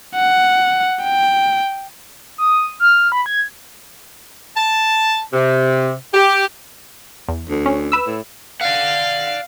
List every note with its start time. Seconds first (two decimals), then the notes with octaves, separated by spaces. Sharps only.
0.15 F#5
1.03 G5
2.38 D#6
2.80 F6
3.12 B5
3.26 G#6
4.56 A5
5.33 C3
6.14 G4
7.28 E2
7.50 D2
7.66 C#4
7.92 B4 E6
8.07 A2
8.61 D5 F5 F#5